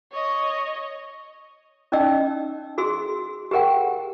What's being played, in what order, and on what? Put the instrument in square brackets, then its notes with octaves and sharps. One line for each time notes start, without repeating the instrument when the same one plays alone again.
[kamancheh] C#5 D#5
[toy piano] C#4 D#4 D5 D#5 G5 E6
F#4 G#4 C6 E6
G4 G#4 A#4 F#5 G5